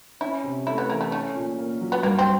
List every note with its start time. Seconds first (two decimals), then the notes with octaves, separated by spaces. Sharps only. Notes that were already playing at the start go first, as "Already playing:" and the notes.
0.21 C#4 E4
0.44 C3
0.67 A3 E4
0.78 B3
0.89 E3 A#3
1.01 A3
1.12 A3 C#4
1.35 A#2
1.58 A#3
1.81 F#3
1.92 B3
2.03 G2 A#3
2.18 C4